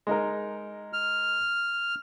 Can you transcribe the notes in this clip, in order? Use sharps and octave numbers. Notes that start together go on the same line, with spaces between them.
G#3 D#4 A#4
F6